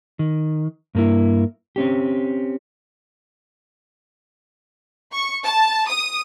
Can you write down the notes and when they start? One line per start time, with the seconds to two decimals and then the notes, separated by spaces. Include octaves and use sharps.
0.19 D#3
0.95 G2 A#3 E4
1.76 C4 C#4 G4
5.12 C#6
5.45 A5
5.88 D#6